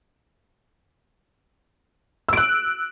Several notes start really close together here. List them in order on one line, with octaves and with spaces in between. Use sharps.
E6 D7 F#6